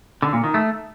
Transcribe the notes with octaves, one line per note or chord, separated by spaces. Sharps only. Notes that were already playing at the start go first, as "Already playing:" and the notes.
D3
A#2
D#3
A3